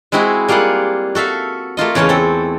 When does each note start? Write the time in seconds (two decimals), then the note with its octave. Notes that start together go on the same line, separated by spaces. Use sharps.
0.12 G#3 C4 E4 F#4 G#4
0.48 G3 A#3 F4 G#4 F#5
1.15 F#4 A4 E5 F5
1.77 A3 A#3 F4 D#5
1.95 E2 C#3 C#4 C#5 A5
2.09 C4 A4